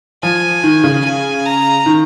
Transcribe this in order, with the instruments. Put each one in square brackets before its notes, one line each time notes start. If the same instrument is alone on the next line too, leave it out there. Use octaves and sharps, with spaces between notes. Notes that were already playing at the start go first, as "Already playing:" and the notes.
[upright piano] F3 [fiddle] G#5
[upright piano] D#3
C#3
[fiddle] G#5
A#5
[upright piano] D#3